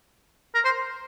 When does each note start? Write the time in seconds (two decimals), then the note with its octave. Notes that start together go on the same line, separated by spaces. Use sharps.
0.55 A#4
0.65 C5